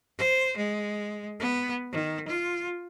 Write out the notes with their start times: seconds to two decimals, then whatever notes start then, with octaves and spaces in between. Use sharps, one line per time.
0.18 C5
0.57 G#3
1.40 B3
1.92 D#3
2.28 F4